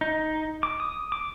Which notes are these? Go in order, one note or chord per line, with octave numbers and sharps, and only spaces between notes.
D#4
D6
D#6
D6